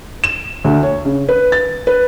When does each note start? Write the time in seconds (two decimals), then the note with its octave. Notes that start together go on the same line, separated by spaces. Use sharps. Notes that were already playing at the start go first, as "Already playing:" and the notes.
0.24 E7
0.64 D2
0.83 C#5
1.05 C#3
1.29 B4
1.52 A6
1.87 B4